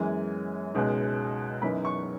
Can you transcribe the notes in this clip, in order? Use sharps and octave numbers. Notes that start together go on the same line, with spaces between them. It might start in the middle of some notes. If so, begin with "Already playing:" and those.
Already playing: F#2 E3 G#3 B3 G#5
C#2 B2 G#3 D#4
F#2 E3 B3 D#4 B5
C#6